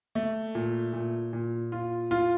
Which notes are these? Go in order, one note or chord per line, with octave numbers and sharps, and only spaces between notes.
A3
A#2
A#2
A#2
F4
F4